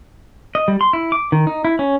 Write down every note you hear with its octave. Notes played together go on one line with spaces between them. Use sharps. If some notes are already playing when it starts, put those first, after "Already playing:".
D#5
G3
C6
E4
D6
D#3
D#4
E4
C#4